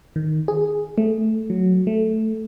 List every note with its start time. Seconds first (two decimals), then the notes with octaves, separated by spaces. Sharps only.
0.16 D#3
0.48 G#4
0.98 A3
1.50 F#3
1.87 A3